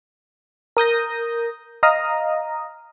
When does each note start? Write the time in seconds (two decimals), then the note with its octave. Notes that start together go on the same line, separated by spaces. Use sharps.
0.77 A#4 D#6 G6 A#6
1.83 D#5 F5 A#5 D#6